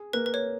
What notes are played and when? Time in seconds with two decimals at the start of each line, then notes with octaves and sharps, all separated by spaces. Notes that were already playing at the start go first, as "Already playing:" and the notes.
Already playing: G#4
0.13 A#3 B4
0.26 B4
0.34 C#5